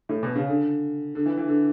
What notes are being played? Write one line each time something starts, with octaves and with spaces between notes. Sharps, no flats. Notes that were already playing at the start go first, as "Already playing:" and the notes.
A2
B2
C#3
D3
D3
E3
E3
D3